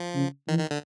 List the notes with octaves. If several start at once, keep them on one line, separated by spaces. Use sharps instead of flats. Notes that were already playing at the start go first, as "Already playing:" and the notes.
Already playing: F3
C#3
D#3 E3
D#3
D3